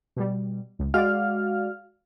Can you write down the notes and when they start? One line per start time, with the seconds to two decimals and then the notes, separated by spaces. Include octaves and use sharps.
0.16 B2 G3
0.79 C#2
0.94 G#3 F#4 D5 F5 F6